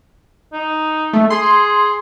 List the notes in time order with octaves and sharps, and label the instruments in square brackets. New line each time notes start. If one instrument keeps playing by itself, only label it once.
[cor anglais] D#4
[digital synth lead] A3
[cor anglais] G#4 [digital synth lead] C6